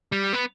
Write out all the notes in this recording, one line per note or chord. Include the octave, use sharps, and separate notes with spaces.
G3
B3